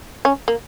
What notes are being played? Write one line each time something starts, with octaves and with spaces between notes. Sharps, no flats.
C#4
A#3